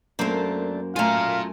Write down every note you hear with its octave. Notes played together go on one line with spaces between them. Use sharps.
F#2 A3 A#3 D4 C5
A3 F4 F5 G#5 A#5